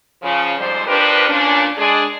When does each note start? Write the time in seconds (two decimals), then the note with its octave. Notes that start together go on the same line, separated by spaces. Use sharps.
0.22 C#3 F3
0.57 F2 G#2 G3 C5
0.87 F3 D4 G4 A#4 B4
1.28 A#2 C#4 D4
1.78 G#3 D4 G#4